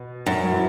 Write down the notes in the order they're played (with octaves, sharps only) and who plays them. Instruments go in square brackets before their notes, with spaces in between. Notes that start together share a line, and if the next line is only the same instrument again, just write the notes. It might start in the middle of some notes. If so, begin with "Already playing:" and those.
Already playing: [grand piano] B2
[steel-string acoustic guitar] F#2
[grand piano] F#3
E3